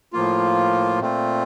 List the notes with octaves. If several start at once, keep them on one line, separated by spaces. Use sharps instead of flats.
A2 F3 A#3 F4
A#2 A3 C4 F4